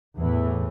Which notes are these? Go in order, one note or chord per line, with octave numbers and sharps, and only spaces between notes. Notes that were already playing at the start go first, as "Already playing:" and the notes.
E2 A2 E3